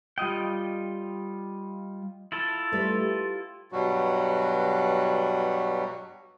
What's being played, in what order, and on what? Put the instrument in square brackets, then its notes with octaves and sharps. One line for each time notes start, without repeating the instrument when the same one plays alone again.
[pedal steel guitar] G3 F4 D#5 G5
E4 F4 A4
[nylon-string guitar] G3 B4 [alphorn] A3
[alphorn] G4
[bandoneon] G2 B2 F#3 G3 F#4